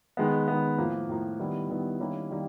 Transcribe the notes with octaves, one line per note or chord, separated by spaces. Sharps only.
D#3 G#3 B3
D#3 G#3 B3
A2 F3 A#3
A2 F3 A#3
D#3 G3 B3 E4
D#3 G3 B3 E4
D#3 G3 A#3 C#4 E4
D#3 G3 A#3